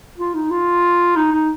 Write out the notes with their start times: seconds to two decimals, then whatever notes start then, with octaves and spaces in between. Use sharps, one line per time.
0.18 F4
0.34 D#4
0.50 F4
1.16 D#4
1.32 D#4